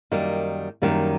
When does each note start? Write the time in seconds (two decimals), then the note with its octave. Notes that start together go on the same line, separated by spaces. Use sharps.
0.12 F#2 D#3 G3 A#3
0.82 F#2 D#3 G3 A#3